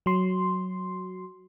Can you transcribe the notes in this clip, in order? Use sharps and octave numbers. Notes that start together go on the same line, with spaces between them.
F#3 C6